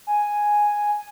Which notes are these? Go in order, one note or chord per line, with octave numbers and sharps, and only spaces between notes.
G#5